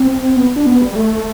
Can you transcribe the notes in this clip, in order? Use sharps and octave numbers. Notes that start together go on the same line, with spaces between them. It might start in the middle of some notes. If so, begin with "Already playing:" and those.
Already playing: C4
B3
D4
B3
G3
A3